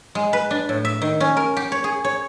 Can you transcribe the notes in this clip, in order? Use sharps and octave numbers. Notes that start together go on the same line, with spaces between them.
G#3
B4
D4
A2
E5
D#3
C#4
A#4
G4
C#5
G#4
C#5